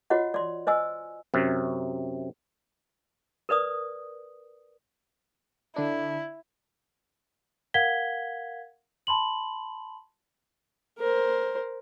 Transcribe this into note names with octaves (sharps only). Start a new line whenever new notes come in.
F4 F#4 C#5 D#5 F#5
D5 C6
C5 D#5 G#5 E6
F#2 C3
A#4 B4 D5 D#6
D3 D4 E4
A#4 F5 F#5 G#6 B6 G7
A5 B5 C6 F#7
A#4 C5